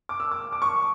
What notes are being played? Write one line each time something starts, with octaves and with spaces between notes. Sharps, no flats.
D6
E6
D6
D6
C#6